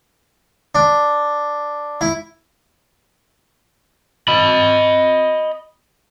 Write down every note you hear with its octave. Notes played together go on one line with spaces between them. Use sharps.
D4
E4
D#5 B5